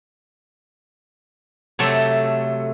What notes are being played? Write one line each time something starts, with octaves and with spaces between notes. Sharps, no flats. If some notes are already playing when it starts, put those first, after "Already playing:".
C3 F#3 A3 A4